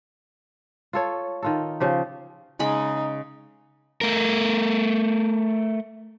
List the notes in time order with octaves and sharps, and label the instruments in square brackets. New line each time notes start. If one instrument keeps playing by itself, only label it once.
[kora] F4 A4 C#5
D#3 F4 A4
C#3 F3 G4
[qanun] C#3 G#3 B5 [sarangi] D#4
[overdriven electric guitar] A3 A#4